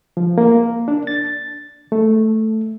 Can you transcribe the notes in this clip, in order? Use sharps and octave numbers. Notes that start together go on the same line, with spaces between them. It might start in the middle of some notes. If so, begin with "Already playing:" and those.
F3
A#3
D4
A6
A3